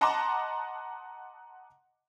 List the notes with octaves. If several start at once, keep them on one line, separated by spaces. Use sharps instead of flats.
D#5 F#5 A5 A#5 C6 D6